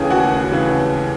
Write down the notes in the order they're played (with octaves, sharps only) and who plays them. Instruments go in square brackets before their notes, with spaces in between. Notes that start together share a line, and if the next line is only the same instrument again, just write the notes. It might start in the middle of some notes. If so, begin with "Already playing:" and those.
Already playing: [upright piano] D#2 C#3 E3 A3 C#4 G#4 G#5
D#2 F#4 F#5
C#3 E3